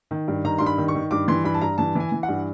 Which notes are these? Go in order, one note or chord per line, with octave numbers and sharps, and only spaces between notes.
D#3
G2
D#3 A#5
G2 C6
B5
D#3
C#6
D#3
G2 D6
E3 C6
G2 B5
A5
G2 A#5
E3 A5
E3 G#5
E3
F#5
G2